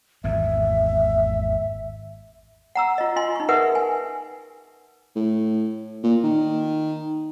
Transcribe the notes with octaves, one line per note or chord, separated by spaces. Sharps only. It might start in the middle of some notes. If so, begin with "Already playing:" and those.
G#1 E2 E5
F#5 A#5 E6
F4 D#5
F4 D#5 G#5 C6
D#4 C#6
G#4 A#4 B4 E5 F#5
G#5
A2
A#2
D#3